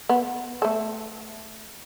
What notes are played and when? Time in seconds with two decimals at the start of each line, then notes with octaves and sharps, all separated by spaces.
0.09 B3
0.62 A3 A4